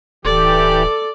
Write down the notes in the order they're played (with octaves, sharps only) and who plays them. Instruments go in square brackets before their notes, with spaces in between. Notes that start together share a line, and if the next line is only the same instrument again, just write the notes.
[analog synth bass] D1 [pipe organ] E3 G4 [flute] A4 [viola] D5